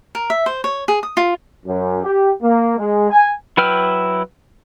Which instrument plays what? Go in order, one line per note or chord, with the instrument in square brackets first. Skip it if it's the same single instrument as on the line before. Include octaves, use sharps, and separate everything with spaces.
[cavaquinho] A#4
E5
C5
C#5
G#4
D#6
F4
[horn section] F#2
G4
A#3
G#3
G#5
[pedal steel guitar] F#3 E4 B4 G5 F6